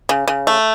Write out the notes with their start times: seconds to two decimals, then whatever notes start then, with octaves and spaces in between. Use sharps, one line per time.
0.09 C#3
0.28 C#3
0.47 A3